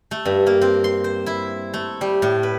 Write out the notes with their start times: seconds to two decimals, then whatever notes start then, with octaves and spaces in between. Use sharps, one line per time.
0.11 A3
0.26 G2
0.47 A#3
0.61 C4
0.84 C6
1.04 C5
1.26 E4
1.74 A3
2.01 G3
2.22 A2
2.43 B4